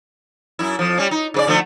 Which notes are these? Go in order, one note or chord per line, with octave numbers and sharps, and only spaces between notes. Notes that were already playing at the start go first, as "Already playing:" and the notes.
F#2 E4
F2 F3
G3 C#4
D#4
C#3 B4 D5
D3 F3 A3